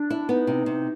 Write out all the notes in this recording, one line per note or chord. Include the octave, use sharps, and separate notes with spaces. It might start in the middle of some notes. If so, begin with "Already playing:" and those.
Already playing: D4
E4
B3 D#4
C3
C3